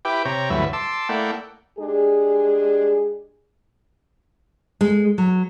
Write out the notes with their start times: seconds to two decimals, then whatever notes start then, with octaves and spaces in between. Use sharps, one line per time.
0.05 E4 G4 B4 G5 D6
0.25 C3 C#5 G5 A#5
0.50 D2 G2 E3 F#3 B4 E5
0.73 A5 C6 D6 E6
1.09 A3 A#3 E4 D5 F#5 G5
1.79 G#3 D4 G4 G#4
4.81 G#3
5.18 F#3